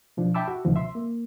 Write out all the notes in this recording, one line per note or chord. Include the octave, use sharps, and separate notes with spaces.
B2 F3 D4
E5 G5 A5 B5 D6 E6
F#4
C#2 B2 D#3 F3
E5 C6
A#3